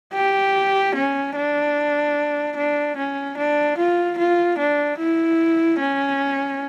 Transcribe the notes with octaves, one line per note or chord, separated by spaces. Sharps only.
G4
C#4
D4
D4
C#4
D4
F4
F4
D4
E4
C#4